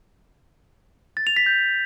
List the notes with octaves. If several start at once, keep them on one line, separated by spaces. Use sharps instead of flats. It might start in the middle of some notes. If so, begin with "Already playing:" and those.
A6
F7
B6
G6